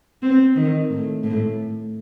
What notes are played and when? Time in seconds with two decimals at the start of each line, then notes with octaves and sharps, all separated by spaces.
0.22 C4
0.56 D#3
0.90 A2
1.24 A2